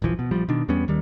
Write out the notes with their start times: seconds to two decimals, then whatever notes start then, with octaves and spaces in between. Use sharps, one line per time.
0.02 D#1 A#1 E3 F3
0.19 B2
0.31 A#1 F3 G3
0.49 B2 D#3 D4
0.68 E2 G3 B3 C#4
0.88 D#2 D#3 G3